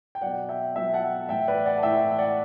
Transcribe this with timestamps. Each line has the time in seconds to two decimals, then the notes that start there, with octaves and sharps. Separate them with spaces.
0.15 G5
0.21 B2 F#3 D5 F#5
0.49 E5 G5
0.75 B2 F#3 E5 G5
0.93 F#5 A5
1.29 A2 E3 E5 G5
1.48 B4 D5
1.65 D5 F#5
1.78 A5
1.83 A2 E3 E5 G5
2.18 D5 F#5